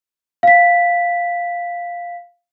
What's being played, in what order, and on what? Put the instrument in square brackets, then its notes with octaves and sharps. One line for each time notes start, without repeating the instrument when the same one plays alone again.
[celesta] F5 B6